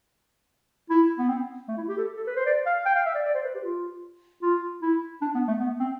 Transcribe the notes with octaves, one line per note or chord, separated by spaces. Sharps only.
E4
B3
C4
A3
E4
G4
A4
A4
B4
C5
D5
F5
G5
F5
E5
D5
D5
C5
B4
G4
F4
F4
E4
D4
B3
A3
B3
C4